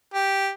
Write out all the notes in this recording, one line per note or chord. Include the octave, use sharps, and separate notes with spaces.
G4